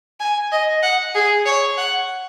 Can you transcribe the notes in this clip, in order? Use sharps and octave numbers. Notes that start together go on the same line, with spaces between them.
G#5
D#5
F#5
G#4
C#5
F#5